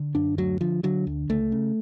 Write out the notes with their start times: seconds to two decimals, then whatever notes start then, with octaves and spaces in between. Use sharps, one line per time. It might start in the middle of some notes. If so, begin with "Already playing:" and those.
Already playing: D3
0.15 F#2 D4
0.38 D2 F#3
0.61 D3 F3
0.83 D3 F#3
1.07 D2
1.29 C#2 A3
1.52 C#3